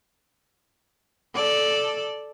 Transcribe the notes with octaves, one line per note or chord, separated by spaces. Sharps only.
A4 D5